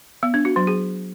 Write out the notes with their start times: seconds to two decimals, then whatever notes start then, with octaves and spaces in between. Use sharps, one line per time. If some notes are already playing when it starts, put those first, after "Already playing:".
0.23 B3
0.34 D4
0.45 F#4
0.56 F#3
0.67 G#4